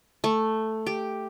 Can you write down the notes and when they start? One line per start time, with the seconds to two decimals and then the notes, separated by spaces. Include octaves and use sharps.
0.24 A3
0.86 G4